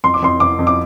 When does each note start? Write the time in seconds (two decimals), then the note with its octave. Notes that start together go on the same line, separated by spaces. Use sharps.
0.04 F2 C6
0.14 D6
0.22 F2 C6
0.40 F2 D6
0.59 F2
0.67 D6